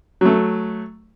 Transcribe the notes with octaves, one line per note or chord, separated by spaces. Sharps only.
F#3 A3